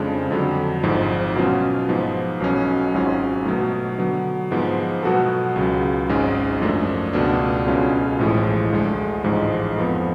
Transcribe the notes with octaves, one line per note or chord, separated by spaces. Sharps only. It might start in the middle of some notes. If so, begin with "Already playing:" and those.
Already playing: F2 C#3 F3 G#3 D4
F2 D3 F#3
G#1 G#2 F3
B2 F#3 C#4 F4
G#2 F3 B3
B1 B2 F#3 C#4
G#1 G#2 F#3 C#4 F4
B2 F#3 A3
D3 F#3 B3
G#2 F3 G#3 B3
B2 F#3 B3 F#4 A4
C#2 C#3 F#3
G#1 G#2 G#3 C#4
F#2 F3 A3 D4
C#2 B2 A3 D4
B1 B2 G#3 C#4 F4
A1 A2 F3 G#3
D2 D3 G#3
A1 G#2 F3 G#3
F2 F3 B3